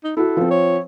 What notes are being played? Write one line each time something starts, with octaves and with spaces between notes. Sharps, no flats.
D#4
E4 F#4 A4
F3 C4
C#5